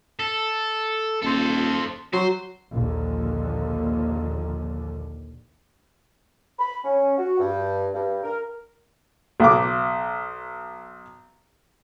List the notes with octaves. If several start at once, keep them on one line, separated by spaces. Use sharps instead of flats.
A4
D#1 A4 C5
F#3 C5
A#1 D#2 A#2 D3
B5
C#4
F#4
G2
G2
A#4
B1 D6